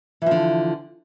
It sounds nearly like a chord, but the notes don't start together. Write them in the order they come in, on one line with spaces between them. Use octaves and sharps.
E3 F3 D3